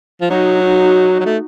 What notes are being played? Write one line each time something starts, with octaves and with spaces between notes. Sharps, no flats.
F3
F#3 D#4 F#4
D#4 F#4
F#3
A3